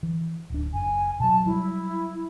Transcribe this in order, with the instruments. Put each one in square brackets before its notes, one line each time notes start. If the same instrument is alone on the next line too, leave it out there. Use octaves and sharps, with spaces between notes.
[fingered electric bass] E3
D1 D4
[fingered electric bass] F#1 [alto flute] G#5
[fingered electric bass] B2 F#3 [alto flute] A5
[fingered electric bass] F#3 G3 [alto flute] E4